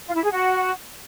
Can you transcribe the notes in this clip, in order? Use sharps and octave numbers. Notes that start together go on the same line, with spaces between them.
F4
E4
G#4
F#4